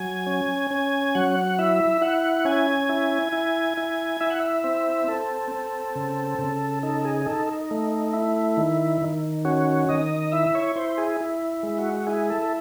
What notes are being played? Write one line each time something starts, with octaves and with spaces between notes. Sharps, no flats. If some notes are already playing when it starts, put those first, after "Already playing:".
Already playing: F#3 G#5
C#4
C#4 G#5
F#3 F#5
E4 E5
E4 F#5
C#4 G#5
E4
E4
E4
E4 E5
F#5
E5
C4 E5
C4 A4
C4
C#3
C#3
D#4 A4
G#4
D#4 A4
A3
E4
D#3
D#3
C#4 F#4
D#3 D#5
E4 E5
C#5
E4 C5
G#4
E4
G#3
F#4
E4 G#4
A4